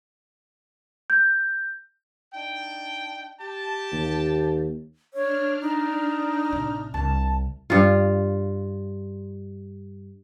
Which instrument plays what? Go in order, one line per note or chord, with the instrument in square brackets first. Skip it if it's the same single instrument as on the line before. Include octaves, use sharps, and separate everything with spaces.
[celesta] G6
[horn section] D4 D#4 G5
G4 A5
[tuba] D#2
[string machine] D4 F6 [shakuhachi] C#5
[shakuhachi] D#4
[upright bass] A1 C3
[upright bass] C2 [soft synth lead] A5
[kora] G2 F4